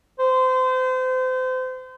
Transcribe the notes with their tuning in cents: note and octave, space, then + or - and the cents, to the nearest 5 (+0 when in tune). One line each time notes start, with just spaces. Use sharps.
C5 -30